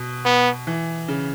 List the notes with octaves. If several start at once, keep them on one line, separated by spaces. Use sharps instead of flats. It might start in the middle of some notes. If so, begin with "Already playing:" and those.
Already playing: B2
B3
E3
C#3